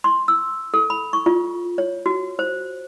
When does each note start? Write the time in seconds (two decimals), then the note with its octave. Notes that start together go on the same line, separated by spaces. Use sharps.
0.04 C6
0.28 E6
0.74 A4
0.90 B5
1.13 C#6
1.26 F4
1.78 C#5
2.06 F#4
2.39 C5